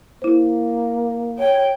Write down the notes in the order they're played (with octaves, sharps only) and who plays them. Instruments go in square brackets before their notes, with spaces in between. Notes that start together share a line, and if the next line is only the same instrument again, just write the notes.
[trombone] A#3 [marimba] E4 C5
[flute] C#5 [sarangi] G5